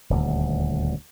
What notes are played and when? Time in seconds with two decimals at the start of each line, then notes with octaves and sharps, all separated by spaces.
0.10 D#1 D2